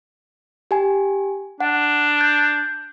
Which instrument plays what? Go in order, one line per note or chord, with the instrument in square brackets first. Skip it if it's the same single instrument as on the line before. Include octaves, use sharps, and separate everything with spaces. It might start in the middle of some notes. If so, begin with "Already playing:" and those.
[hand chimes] G4 G#5
[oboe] D4 [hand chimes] F#5
[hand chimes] G6